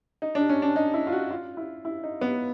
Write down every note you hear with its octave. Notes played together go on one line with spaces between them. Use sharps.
D#4
D4
C#4
D4
D#4
E4
F4
F#4
F4
E4
E4
D#4
B3